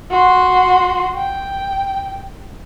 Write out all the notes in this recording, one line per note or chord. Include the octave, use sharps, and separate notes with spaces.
F#4 C6
G5